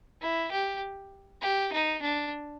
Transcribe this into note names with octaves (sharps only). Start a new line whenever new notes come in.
E4
G4
G4
D#4
D4